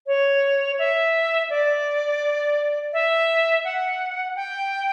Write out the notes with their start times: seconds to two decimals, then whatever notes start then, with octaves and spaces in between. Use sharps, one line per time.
0.07 C#5
0.79 E5
1.50 D5
2.93 E5
3.65 F#5
4.36 G5